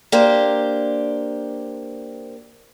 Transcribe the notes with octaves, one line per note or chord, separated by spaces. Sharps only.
A#3 D4 G4 C5